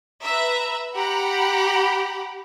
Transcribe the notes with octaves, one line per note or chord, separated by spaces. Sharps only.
B4 E5 A#5
G4 F#5 A#5 B5